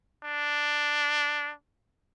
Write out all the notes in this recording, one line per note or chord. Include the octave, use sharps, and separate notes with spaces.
D4